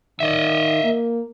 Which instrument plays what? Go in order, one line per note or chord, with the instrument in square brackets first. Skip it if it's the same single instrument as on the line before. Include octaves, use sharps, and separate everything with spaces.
[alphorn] D#3 [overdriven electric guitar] D#5 E5
[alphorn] A#3